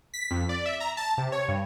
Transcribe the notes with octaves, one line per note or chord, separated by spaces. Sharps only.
B6
F2
D5
E5
A#5
A5
C3
C#5
G2